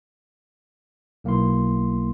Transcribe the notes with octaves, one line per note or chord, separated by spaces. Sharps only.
B1 A#3 E4 C6